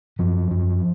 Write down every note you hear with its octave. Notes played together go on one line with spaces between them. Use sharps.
F#2 F3
F#2